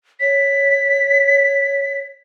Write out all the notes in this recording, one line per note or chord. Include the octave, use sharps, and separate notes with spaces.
C#5 B6